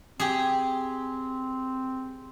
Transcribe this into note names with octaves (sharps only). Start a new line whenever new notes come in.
C4 G4 G#4